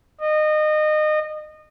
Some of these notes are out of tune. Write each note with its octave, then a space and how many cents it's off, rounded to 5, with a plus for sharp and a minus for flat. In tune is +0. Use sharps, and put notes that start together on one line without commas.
D#5 -25